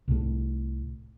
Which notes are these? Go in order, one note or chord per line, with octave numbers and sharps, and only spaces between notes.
C2 A2